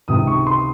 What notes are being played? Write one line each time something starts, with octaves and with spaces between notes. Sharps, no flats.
C#2 C3 D#3 D#6
C#6
C6